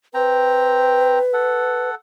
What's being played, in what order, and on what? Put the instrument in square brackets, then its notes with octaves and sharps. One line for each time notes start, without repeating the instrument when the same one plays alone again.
[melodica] C4 G5 A#5 [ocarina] B4
[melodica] A4 F#5